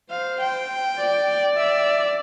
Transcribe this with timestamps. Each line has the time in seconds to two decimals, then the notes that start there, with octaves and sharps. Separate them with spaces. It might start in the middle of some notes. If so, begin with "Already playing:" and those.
0.10 C5 F5
0.40 G5
0.98 D5
1.57 E5